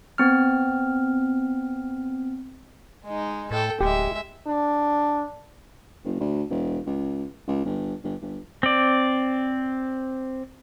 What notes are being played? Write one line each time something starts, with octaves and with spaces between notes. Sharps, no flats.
B3 C4 F6
G#3 D#4
A2 A4 G5
D1 G#3 G4 E5
D4
F#1
D2
E1
C#2
C#2
G1
G1
G1
C4 D5